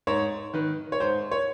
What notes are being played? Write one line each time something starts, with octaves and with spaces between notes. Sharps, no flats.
G#2 C#5
D#3 B4
C#5
G#2 C5
C#5